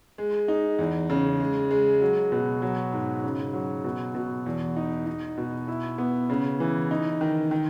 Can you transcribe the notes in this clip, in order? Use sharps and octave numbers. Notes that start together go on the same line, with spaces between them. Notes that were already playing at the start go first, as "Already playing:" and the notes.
G#3
D#4
E2
C#3
G#3
G#3
F#3
B2
F#3
G#2
C#3
F#3
B2
B2
E2
D#4
D#4
B2
E4
B3
C#3
E3
D#4
D#3
D#3